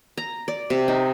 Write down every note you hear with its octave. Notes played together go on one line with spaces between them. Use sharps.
A#5
D5
C3
D#4